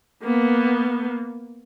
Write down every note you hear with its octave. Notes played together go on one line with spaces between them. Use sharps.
A#3 B3